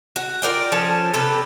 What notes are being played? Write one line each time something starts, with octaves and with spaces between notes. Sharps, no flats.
F#4
F4 A#4 D5 G5
F3 C#4 A4
C3 G4 A4 B4